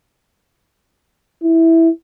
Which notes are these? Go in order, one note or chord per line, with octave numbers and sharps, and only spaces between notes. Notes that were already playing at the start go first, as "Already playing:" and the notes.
E4